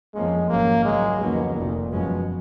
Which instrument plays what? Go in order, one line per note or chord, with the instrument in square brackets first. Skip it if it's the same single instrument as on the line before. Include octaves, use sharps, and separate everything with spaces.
[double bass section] F2 F3 A#3 C#4 [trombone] G#3
[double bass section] G#1 G#2 F#3 C#4 [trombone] A#3
[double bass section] C#2 C#3 F#3 C#4 [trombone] G#3
[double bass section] F2 D#3 A#3 C#4 [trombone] B2
[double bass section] F1 F2 D#3 [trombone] A#2
[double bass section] F#2 F3 G#3 C#4 [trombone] B2